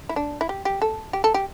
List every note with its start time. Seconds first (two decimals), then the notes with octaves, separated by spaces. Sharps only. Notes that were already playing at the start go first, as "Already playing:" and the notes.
0.09 E4
0.16 D4
0.41 E4
0.49 G4
0.65 G4
0.82 A4
1.13 G4
1.24 A4
1.34 G4